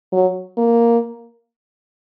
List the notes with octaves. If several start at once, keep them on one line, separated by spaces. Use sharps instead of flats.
F#3
A#3